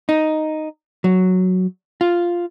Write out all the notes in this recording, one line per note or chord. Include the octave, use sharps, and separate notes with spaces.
D#4
F#3
F4